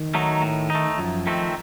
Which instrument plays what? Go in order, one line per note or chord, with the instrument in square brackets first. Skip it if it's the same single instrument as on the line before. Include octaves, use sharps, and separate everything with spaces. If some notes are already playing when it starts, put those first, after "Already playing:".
Already playing: [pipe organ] D#3
[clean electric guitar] F#3 A3 D#4
A2
A3 D#4
[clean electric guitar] F#2 [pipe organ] F3
[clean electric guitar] D#3 A3 C4